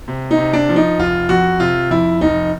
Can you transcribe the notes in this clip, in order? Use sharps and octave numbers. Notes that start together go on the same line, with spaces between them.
C3
D#4
C3
D4
F3
D#4
F1 F4
F2 F#4
C3 F4
F2 E4
F1 D#4